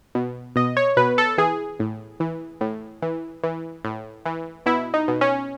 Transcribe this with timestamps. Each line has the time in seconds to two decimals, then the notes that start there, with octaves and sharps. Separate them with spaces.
0.15 B2
0.56 B2 D#5
0.77 C#5
0.97 B2 B4
1.18 A4
1.38 E3 G#4
1.80 A2
2.20 E3
2.61 A2
3.02 E3
3.43 E3
3.85 A2
4.26 E3
4.66 B2 E4
4.94 D#4
5.08 B2
5.21 C#4